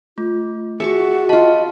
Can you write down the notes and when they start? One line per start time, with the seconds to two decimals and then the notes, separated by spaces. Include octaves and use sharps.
0.18 A3 F4
0.80 F#4 G#4 E5 A5 C#6
1.29 F4 D#5 A5 B5